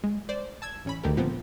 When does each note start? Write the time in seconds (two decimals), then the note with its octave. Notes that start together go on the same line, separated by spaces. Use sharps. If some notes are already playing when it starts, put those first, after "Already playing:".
0.04 G#3
0.29 C5 D5
0.62 A5 E6 G#6
0.85 A1 C#4 B5
1.04 D2 D#3 G4 A4 A#4
1.17 A#2 F3 B3 C4